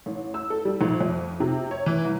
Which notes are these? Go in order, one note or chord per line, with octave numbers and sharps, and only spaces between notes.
A1
E6
A4
G3
A#1
F2
C3
C#5
E3
C2